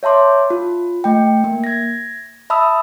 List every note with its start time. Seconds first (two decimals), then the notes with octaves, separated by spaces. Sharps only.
0.03 C#5 E5 A5 C6 D6
0.50 F4
1.04 A3 G5
1.44 A#3
1.64 G#6 A#6
2.50 E5 A5 B5 D#6 E6